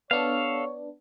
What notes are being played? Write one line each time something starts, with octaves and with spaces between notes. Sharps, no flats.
B3 D4 A4 C#5 F5